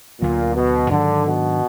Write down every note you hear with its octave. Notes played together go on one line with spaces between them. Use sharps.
D2 A#2 D3 F#3 B3
B2
G#2 D3 D#3 F#3 D4
B2